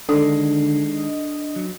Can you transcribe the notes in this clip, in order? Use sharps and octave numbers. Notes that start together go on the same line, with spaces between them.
D3 D#3 G#3 D4 A4
D#5
F#3